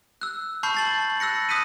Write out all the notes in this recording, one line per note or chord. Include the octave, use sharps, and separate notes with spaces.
E6 F#6
A5 B5 C#6 F6 G6 C7
A5 A6 F#7
E6 F#6 A#6 C#7
D#6 F#6 B6 C#7 D#7